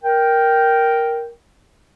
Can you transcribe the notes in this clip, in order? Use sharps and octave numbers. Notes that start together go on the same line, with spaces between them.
A#4 G5